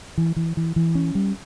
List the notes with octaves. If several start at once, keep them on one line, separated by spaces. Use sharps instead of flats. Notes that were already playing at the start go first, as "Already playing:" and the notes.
E3
E3
E3
E3
C#4
G3